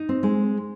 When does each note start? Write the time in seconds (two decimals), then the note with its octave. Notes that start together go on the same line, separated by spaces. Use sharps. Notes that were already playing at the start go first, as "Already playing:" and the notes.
Already playing: D#4
0.09 C4
0.23 G#3